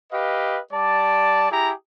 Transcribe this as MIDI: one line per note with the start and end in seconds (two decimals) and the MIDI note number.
0.12 0.59 67
0.12 0.59 71
0.12 0.59 75
0.12 0.59 77
0.72 1.46 55
0.72 1.46 74
0.72 1.46 81
1.50 1.72 64
1.50 1.72 67
1.50 1.72 68
1.50 1.72 82